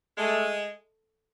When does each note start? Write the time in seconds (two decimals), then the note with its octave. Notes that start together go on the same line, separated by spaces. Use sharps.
0.18 G#3 A3